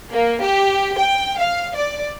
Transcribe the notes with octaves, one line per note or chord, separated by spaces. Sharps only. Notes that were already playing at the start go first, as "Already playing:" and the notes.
A#3
G4
G5
F5
D5